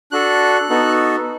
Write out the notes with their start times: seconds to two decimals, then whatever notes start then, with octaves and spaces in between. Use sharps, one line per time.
0.12 D4 F#4 A4 F#6
0.69 B3 D#4 F#4 A4